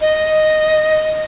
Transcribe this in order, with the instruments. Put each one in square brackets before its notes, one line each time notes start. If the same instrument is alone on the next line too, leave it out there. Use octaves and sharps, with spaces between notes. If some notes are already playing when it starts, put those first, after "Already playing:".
[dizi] D#5